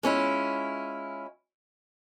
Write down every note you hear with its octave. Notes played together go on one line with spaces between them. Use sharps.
G#3 C#4 E4 F4